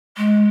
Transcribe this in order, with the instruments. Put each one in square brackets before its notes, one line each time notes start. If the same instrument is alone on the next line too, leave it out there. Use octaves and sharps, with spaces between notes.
[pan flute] G#3